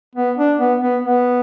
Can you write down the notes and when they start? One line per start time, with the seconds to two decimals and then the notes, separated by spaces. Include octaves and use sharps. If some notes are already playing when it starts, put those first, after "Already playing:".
0.15 B3
0.37 D4
0.59 B3
0.81 B3
1.03 B3